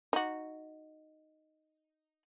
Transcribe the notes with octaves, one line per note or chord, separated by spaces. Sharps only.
D#4 F#4